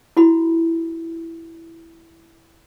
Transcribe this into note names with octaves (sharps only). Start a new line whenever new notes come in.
E4 F#4 B5